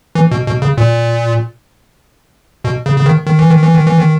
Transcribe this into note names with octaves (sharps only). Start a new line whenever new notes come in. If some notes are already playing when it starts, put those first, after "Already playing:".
E3
B2
B2
C#3
A#2
B2
C#3
C#3
D#3
D#3
E3
D#3
E3
D#3
E3
D#3